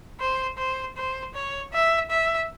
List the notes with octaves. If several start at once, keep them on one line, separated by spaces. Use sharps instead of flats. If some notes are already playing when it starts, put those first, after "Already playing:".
C5
C5
C5
C#5
E5
E5